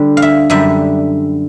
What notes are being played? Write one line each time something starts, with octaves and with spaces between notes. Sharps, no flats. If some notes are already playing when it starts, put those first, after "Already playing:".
Already playing: D3 G3
F5
E5
F#2 D3 G3 E5